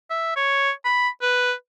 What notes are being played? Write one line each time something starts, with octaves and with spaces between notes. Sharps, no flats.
E5
C#5
B5
B4